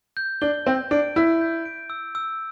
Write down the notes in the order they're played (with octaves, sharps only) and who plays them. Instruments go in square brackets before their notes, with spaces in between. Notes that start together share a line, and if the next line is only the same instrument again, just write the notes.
[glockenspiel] G6
[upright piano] D4 [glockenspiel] G7
[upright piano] C4 [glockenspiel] G6
[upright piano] D4 [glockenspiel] D7
[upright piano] E4 [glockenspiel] G6
[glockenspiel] G6
D7
E6
E6